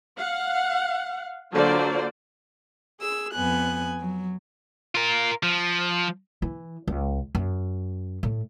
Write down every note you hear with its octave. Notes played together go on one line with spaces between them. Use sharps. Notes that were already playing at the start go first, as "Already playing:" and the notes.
F5 F#5
D3 F#3 A#3 F4 C5 D5
G#4 E6
F2 B3 G#5 F#6
F#3
F4 A#4
F3
E3
C#2
F#2
A2